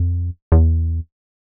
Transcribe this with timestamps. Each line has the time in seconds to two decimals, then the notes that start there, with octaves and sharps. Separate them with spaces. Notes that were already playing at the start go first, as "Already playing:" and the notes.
Already playing: F2
0.52 E2